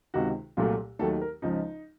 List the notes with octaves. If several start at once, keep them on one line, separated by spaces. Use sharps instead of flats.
C#2 C3 D#3 F#4
C2 A#2 F#3 A3 F4
D#2 D#3 F#3 A3 A4
A#4
C#2 C#3 F3 D#4